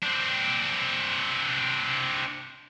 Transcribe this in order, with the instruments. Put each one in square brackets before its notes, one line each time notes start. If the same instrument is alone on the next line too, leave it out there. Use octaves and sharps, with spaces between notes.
[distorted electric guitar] C4 D4